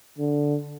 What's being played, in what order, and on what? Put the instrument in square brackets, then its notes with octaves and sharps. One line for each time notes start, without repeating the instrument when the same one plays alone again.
[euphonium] D3